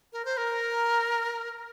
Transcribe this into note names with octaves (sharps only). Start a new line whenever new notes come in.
A#4
C5
A#4